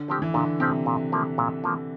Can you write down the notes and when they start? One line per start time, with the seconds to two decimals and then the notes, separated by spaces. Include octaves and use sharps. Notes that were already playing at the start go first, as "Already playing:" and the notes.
Already playing: D3
0.08 F3 C4 G4
0.22 E3
0.34 A#2 D3
0.60 C3 F3 C4 G4
0.86 A#2
1.12 F3 A#3
1.38 A#2
1.64 F3 A#3